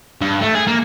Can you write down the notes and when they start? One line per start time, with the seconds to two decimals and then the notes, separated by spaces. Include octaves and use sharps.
0.21 G2
0.41 A3
0.55 G#4
0.67 A#3